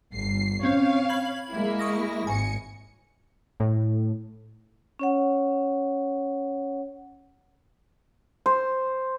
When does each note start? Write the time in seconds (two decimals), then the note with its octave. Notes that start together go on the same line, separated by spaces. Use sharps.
0.13 G1 C7
0.63 C4 C#4 C#5 F5
1.09 B5 G#6 F#7
1.50 G#3 A#3 E4
1.79 C#6 D#6 A#6
2.27 G#1 G#5 C#7
3.60 A2
4.99 C#4 C#5 F#5
8.46 C5